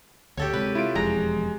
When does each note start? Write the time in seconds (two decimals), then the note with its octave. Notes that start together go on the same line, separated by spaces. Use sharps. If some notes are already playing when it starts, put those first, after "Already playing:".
0.37 D2 G4 A4 C#5
0.53 C3 G#3 B4
0.75 E4 F4 D7
0.95 E1 F2 G#3 A#5